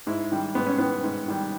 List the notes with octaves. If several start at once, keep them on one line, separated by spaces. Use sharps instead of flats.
G#2 E4
D#3 G3
G#2 B3
C#4
D#3 G3 B3
G#2
D#3 G3